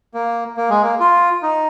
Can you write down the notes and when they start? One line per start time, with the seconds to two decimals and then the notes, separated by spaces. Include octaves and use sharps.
0.14 A#3
0.57 A#3
0.70 G#3
0.83 A#3
1.00 F4
1.43 D#4